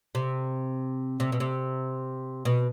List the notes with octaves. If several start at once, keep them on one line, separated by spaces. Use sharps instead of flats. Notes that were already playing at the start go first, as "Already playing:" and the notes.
C3
C3
B2
C3
B2